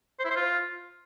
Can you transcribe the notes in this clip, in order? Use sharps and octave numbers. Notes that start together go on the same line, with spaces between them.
C5
E4
C5
F4